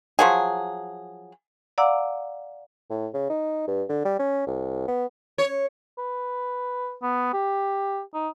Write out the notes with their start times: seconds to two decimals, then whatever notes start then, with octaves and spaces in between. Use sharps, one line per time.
0.19 F3 F#3 G#4
1.78 D5 F5 F#5 A#5 D6 E6
2.90 A2
3.14 C#3
3.30 D#4
3.67 G2
3.89 D3
4.05 G3
4.19 C#4
4.47 C2
4.88 B3
5.38 C#5
5.98 B4
7.03 B3
7.33 G4
8.14 D#4